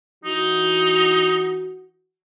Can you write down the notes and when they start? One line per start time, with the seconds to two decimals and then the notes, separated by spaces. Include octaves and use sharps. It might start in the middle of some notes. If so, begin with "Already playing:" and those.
0.25 E3 D#4 F#4